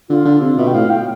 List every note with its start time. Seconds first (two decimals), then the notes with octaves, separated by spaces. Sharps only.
0.09 D3 F4
0.25 D3
0.41 C3
0.58 B2 E5
0.67 G5
0.74 A2 F5
0.90 G5